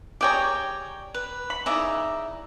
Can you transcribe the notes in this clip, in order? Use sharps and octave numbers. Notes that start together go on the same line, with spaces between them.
G4 G#4 C#5 D5 G5 A#5
B4
B5
C#3 E3 D#4 D5 E5 A#5